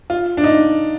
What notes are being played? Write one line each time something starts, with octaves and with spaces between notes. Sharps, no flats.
F4
D4
D#4